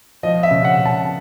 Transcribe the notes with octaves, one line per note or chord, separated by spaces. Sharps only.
F3 D#5
E5
C#3
F#5
C#3
A5